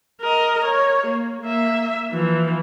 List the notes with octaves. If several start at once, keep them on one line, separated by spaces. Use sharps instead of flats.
A#4 D#5
C#5
A#3
A#3 E5
E3 F3